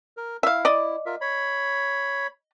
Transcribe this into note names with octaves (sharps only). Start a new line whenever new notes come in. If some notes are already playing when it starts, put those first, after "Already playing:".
A#4
E4 E5 F5
D5 D#5
F4 A#4 E5
C#5 B5